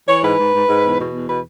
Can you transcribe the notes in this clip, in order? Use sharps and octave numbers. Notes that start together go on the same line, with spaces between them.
E3 C#5
G#2 B4
G#2
G#2
G#2
E2
B2
E2
B2 B4